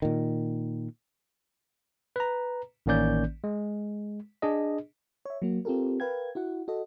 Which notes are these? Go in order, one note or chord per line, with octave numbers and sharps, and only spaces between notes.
A#2 D#3
B4 A#5
A1 D#3 A#3 C#4 D5 G6
G#3
D4 G#4 D#5
C#5 E5
F#3 A#3 F#4
C4 F4 G4 A4 A#4
A#4 B4 F5 G5 G#6
E4 F#4 F#5
F#4 A4 D#5